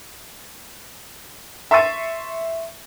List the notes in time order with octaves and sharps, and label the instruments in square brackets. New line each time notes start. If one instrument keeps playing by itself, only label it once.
[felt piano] E5 C6 C#6 E6 A6 D#7